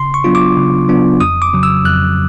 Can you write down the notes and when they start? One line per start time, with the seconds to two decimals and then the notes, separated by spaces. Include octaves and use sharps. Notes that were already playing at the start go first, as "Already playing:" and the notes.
Already playing: C#3 C6
0.14 C#6
0.24 F#3 B3 D4 F4
0.35 D6
0.57 C#3
0.88 F#3 B3 D4 F4
1.21 F2 D#6
1.42 D6
1.53 C#3 F#3
1.63 E6
1.85 F2 F#6